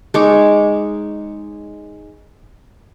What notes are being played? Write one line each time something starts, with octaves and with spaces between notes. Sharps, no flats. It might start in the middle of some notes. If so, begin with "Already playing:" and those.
G#3 D#4 C#5 D6